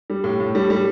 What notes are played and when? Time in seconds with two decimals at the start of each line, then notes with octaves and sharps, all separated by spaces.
0.10 G3
0.24 A2
0.40 A2
0.55 G3
0.70 G3